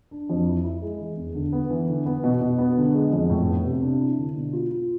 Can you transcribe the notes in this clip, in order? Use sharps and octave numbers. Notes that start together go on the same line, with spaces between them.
D4
F2
E4
E4
G#3
E3
E2
D3
B3
E3
D3
B3
B2
B2
B3
D3
G#3
F2
A2
B3
C3
D4
E4
D3
B2
F4
F4